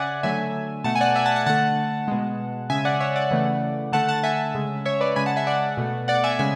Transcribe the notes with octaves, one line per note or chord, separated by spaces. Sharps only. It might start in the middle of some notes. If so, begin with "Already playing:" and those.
Already playing: C#3 D5 E5 F#5 G#5
D3 F#3 A3 E5 G#5
B2 A3 F#5 A5
G#5
D5 F#5
E5 G#5
F#5 A5
F#5 A5
D3 A3 F#5 A5
B2 G#3
C#3 G#3 E5 G#5
D5 F#5
C#5 E5
D5 F#5
C#3 E3 A3
D3 A3 F#5 A5
F#5 A5
E5 G#5
C#3 G#3
C#5 E5
B4 D5
C#3 G#3 G#5 B5
F#5 A5
E5 G#5
D5 F#5
B2 A3
D5 F#5
E5 G#5
C#3 G#3 E5 G#5